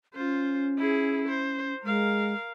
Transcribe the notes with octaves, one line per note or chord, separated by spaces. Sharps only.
C#4 F4 C5
E4 G#4
C5
G#3 A#4 F5